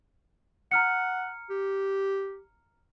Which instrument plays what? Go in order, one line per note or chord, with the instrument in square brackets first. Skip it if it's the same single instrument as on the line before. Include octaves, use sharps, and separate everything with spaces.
[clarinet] F#5 [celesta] A#5 F6 C#7
[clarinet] G4